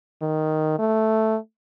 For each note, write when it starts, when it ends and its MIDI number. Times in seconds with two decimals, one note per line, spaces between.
0.22 0.75 51
0.79 1.37 57